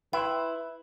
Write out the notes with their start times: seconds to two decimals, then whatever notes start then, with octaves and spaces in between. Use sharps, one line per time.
0.13 E4 B4 G5 C6